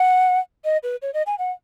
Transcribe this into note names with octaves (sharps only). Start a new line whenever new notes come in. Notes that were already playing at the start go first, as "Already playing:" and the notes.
Already playing: F#5
D#5
B4
C#5
D#5
G#5
F#5